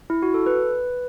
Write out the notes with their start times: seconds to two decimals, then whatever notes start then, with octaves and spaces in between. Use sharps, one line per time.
0.10 E4
0.23 F#4
0.34 A4
0.46 B4